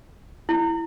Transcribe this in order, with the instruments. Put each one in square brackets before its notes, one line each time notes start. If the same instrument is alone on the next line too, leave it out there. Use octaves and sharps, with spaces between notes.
[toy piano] E4